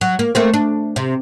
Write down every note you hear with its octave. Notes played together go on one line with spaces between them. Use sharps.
F#3
A#3
A3 A#3 C4
D4
C3